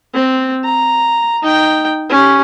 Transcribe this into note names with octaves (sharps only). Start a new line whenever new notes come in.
C4
A#5
D#4 G5
C#4 G4